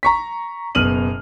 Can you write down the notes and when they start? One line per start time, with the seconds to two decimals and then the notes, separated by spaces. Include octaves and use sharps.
0.03 A#5 C#6 B6
0.75 F#1 B2 F6 D#7 F#7